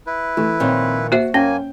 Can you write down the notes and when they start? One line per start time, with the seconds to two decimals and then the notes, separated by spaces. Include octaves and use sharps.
0.07 E4 B4
0.37 E3 A3
0.60 A#2 D#3 F3 C4 C#5
1.12 A#3 F#4 C5 E5
1.34 F#2 A#3 C#4 G5 G#5